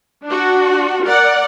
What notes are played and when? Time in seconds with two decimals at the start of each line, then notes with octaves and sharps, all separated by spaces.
0.25 D4 F#4
1.05 A#4 D5 F#5